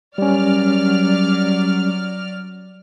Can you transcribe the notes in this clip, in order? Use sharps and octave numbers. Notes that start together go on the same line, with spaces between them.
F#3 G3 C#4 D5 F6